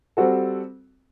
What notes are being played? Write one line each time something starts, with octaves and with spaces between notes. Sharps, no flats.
G3 C4 F#4 A4